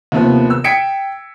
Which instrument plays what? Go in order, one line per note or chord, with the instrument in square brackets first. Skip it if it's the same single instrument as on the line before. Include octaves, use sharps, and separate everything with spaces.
[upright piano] D#2 C3 F3 B3
E6
G5 G#6 B6 C#7 D7 E7